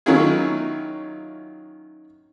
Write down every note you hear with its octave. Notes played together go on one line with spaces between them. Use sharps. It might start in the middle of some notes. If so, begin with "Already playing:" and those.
D#3 F#3 C#4 E4 F4 G#4